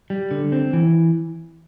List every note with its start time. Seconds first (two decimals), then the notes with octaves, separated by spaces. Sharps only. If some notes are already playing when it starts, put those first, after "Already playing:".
0.10 G3
0.31 D3
0.52 C4
0.73 E3